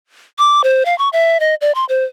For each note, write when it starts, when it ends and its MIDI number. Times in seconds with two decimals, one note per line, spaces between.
0.39 0.62 86
0.64 0.85 72
0.85 0.97 77
0.98 1.09 85
1.13 1.40 76
1.40 1.55 75
1.61 1.72 74
1.75 1.85 84
1.89 2.05 72